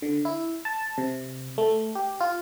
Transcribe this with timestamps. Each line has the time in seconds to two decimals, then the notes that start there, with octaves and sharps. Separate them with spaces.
0.02 D3
0.25 E4
0.65 A5
0.98 C3
1.58 A3
1.95 G4
2.21 F4